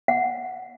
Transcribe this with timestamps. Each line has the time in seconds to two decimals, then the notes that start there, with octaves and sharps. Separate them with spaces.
0.08 F#5